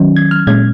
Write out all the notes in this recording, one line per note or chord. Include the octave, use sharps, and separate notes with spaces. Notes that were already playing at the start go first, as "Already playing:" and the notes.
Already playing: D#3 F#3 C#4
G#6
F6
A#2 G#3 C#4 G#6